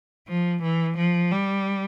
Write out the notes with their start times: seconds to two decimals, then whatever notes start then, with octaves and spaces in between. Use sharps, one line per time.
0.28 F3
0.62 E3
0.97 F3
1.31 G3